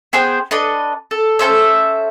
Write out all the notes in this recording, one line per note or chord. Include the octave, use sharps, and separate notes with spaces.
B3 G#4 C5 G5
D4 A4 B4 D#5
A4
C#4 A4 C5 E5